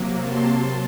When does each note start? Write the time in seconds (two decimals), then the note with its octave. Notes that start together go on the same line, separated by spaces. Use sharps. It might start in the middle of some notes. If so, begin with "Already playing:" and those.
Already playing: C3 F#3 A#3
0.18 A5 C6